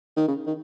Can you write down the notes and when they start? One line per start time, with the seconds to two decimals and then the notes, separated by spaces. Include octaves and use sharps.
0.16 D#3
0.28 C#3
0.47 D#3